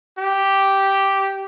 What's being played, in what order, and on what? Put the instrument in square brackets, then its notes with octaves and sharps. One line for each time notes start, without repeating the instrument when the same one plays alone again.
[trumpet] G4